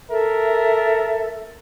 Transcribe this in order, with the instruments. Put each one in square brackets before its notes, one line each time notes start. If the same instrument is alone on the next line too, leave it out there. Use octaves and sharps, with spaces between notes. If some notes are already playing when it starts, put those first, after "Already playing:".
[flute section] A4 E5 [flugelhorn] A#4